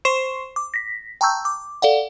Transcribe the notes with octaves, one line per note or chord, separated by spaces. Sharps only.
C5 C6 C#6 C7 E7
D6
A#6 B6
G5 A5 A#5 C#6 E6 G6
D6
A4 D5 F5 F#5